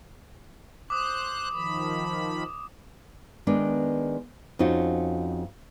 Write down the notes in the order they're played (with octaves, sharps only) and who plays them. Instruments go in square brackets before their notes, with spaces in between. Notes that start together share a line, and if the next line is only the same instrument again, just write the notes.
[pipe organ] C5 F#6 [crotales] D6 D#6
[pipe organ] D#3 F3 B5
[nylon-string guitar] D#3 G#3 B3 D4
F2 C#4 D#4 F4 F#4